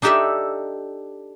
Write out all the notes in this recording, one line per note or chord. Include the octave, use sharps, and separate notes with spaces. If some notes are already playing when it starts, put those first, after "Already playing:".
D4 D#4 G4 A4 D5 E5